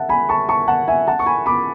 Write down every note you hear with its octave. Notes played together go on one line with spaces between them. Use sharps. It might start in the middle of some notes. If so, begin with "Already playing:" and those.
Already playing: E5 F#5 A5
G#5 B5
A5 C#6
A5 C#6
F#5 A5
E5 G#5
F#5 A5
C#6
G#5 B5
B5 D6